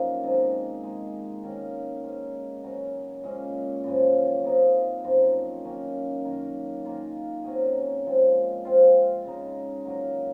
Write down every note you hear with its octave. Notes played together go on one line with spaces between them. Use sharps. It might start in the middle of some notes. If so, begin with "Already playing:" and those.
Already playing: F#2 F3 A#3 D#4
C3 D#3 G#3
G#3 D#4 G#4
D#3 A#3 C#4
G#3 C#4 G#4
C#3 F#3 C#4
A#2 G#3 C#4
F#2 C#3 F3
C3 F3 A#3 D#4
F#2 F3 C4 D#4
D#3 A#3 C#4
F#2 D#3 A#3
D#3 A#3 F4
C3 F#3 C#4 G#4
A#2 F3 G#3 C4
C3 F3 C4 F4
C#3 G#3 D#4
A#2 F#3 A#3